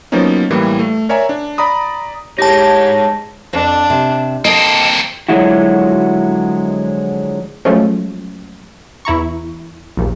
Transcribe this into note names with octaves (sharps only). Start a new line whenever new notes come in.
F3 F#3 A#3 B3 C#4 D#4
A2 E3 G3 A#3
A3
A#4 C#5 D5 E5 G#5 A#5
D4
D5 A#5 B5 D#6
G#3 D#4 G4 C#5 A5 A#6
F2 D4
C3
A#3 C4 A4 D#5
D3 F3 F#3 G#3 E4 F#4
F3 F#3 G#3 A3 C#4
E2 E4 A#5 C#6
A#1 D#2